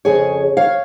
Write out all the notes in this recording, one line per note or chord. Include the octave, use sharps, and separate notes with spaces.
F2 C#3 G#4 C#5
D#3 C#5 F5